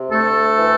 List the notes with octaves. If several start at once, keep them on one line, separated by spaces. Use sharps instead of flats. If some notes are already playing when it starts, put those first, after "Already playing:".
Already playing: C3
D2 A3 A4
E3